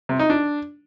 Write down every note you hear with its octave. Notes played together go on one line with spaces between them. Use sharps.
C3
D#4
D4